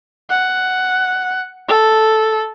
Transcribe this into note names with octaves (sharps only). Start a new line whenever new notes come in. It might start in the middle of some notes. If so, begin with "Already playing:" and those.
F#5
A4